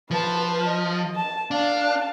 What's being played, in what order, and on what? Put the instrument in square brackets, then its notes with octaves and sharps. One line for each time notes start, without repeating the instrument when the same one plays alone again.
[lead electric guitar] F3 [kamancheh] B4 A5
[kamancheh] D#5
A5
[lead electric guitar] D4 [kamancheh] F5 A5